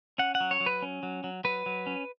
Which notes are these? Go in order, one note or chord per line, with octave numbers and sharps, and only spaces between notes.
C#4 F#5
F#5
F#3
C#5
F#3
B4
C#4
F#3
F#3
F#3 B4
F#3
C#4